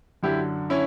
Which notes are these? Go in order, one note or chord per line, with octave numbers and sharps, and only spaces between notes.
F#2 D3 E4 G4
C#4 E4